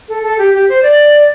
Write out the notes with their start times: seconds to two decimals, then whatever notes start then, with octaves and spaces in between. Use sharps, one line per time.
0.09 A4
0.23 A4
0.38 G4
0.54 G4
0.69 C5
0.83 D5